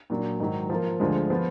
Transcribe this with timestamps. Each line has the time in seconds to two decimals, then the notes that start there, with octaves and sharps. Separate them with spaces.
0.10 A#2 F#3 D4
0.40 G#2 D#3 F#3
0.70 F3 A#3 F4
1.00 D2 D3 F3 G#3
1.30 F3 B3 F4